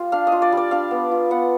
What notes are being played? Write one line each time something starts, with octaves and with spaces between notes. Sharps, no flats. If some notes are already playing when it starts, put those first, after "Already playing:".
Already playing: G3 F4
D4 F5
D#5
F4
D5
G3 D5
D4 F5
B3
F4
B3 F#5